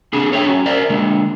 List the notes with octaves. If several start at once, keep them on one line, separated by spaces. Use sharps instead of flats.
C4 D4 G#4
A4 C#5 E5 G5
C#4 F#4
A#4 C5 D5 E5
D3 G#3